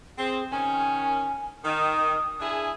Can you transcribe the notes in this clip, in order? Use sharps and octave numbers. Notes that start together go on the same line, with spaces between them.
C4 G#4
D#3 C#4 G#5
D#3 D#6
D4 E4 G#4